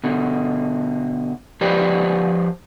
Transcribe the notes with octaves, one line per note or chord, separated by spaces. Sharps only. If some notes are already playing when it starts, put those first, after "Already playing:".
B2 D3
F3 G4 B4 C5 D5